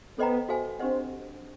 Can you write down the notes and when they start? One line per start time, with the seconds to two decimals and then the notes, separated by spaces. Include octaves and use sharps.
0.18 B3 A4 C5 D#5 G5 A#5
0.49 F#4 A4 C5 F5 G#5
0.79 C4 D4 G4 C5 D#5 F#5